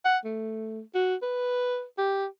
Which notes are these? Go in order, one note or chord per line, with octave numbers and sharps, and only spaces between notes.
F#5
A3
F#4
B4
G4